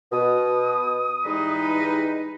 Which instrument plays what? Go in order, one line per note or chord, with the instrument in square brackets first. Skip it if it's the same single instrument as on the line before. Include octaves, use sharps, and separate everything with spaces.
[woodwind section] B2 [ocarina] D#6
[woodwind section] E3 G3 G#3 [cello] D#4 B4